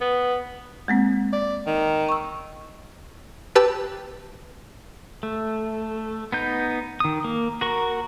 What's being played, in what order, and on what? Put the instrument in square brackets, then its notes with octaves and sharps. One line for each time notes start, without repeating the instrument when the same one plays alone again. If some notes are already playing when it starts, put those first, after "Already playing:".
[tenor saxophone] B3
[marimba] G#3 A#3 C4
[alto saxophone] D5
D#3
[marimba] C#6 E6
[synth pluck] G4 B4 A5 E6
[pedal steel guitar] A3
B3 D#4 G6
D#3 D#6
A#3
F#4 A#4 C#6